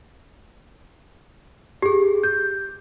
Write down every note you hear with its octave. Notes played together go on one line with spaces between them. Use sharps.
G4 G#4
G6